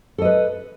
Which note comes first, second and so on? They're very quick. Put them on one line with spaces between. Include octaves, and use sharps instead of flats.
A4 D#5 B4